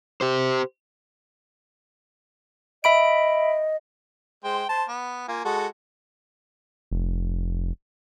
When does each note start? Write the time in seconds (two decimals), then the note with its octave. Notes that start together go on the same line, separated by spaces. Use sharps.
0.21 G4 C5
2.84 D#5 E5 B5 D7
4.44 G#3 C5 G5
4.69 C5 A5
4.88 B3
5.28 A#3 F4 G#5
5.45 G#3 F#4 A4
6.91 F1